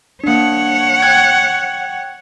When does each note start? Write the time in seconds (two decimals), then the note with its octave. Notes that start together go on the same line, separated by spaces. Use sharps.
0.24 A#3 D4 C#5 F#5
1.02 G5 F#6 G#6